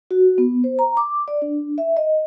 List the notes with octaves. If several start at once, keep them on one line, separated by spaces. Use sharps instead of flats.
F#4
B3
C5
A#5
D6
D5
D4
E5
D#5